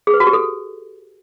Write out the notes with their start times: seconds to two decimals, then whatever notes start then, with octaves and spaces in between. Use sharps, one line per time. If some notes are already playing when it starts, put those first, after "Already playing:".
0.07 G#4
0.14 B4
0.20 F#4
0.27 G4
0.33 A4